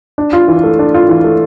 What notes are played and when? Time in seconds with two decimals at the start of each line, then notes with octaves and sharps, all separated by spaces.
0.18 D4
0.33 F4
0.48 E3
0.64 A3
0.79 D4
0.94 F4
1.09 E3
1.24 A3